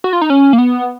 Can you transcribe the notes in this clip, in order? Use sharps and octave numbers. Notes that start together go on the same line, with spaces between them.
F#4
F4
D#4
C#4
A#3
B3